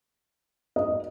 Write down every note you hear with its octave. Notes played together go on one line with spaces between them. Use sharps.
D#5